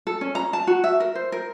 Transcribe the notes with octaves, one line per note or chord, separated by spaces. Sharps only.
A4
C#4
A#5
A5
F#4
E5
A#4
C5
A#4